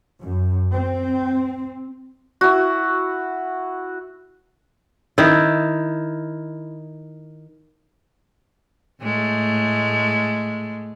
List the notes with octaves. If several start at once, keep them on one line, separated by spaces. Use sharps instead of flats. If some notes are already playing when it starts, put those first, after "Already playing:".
F#2
C4
E4 F#4
D#3 E4
A2 G#3 A3